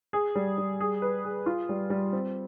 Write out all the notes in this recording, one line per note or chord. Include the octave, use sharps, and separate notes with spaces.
G#4
G3
G3
G#4
B4
G#4
F4
G3
G3
C4